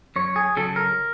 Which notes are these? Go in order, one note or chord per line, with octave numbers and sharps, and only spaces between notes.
F#2 C#5
G#4
C#3 F#3 A4
A#4